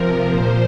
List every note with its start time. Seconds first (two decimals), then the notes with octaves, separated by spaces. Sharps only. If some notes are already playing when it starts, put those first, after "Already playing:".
Already playing: C3 F3 A#4
0.28 A#2 F3 C5